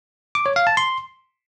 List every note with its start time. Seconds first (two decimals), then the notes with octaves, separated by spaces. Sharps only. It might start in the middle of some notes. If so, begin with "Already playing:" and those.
0.35 D6
0.46 C#5
0.56 F5
0.67 A5
0.77 C6